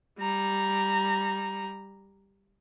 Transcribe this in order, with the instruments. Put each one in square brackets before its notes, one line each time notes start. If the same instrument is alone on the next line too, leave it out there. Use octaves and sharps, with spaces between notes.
[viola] G3 A#5